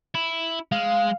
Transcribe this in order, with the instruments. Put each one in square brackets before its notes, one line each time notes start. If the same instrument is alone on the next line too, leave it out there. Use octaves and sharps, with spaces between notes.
[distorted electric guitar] E4
[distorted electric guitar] G#3 [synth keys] F5